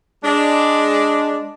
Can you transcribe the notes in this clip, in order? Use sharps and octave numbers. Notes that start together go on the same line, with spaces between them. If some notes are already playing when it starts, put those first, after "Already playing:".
G#3 D4